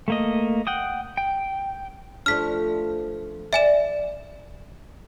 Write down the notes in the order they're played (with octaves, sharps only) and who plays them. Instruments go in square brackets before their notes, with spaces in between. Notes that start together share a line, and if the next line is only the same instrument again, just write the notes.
[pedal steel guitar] A3 A#3 D#5
F#5 G5 D#6
G5
[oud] F3 A3 D4 [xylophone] F6 B6
[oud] D5 [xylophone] E5 G#5 E7